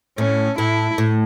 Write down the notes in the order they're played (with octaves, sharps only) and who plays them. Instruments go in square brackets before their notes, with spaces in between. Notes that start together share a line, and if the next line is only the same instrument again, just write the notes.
[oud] A2 [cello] C#4
[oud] A2 [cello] E4
[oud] A2